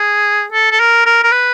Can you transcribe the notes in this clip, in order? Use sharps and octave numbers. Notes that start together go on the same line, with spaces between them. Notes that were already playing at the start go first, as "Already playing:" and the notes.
Already playing: G#4
A4
A4
A#4
A#4
A#4
B4